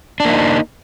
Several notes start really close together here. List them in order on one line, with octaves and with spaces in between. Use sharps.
D4 A#3 D#4